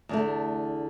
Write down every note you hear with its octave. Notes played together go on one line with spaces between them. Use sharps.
E2 D3 A3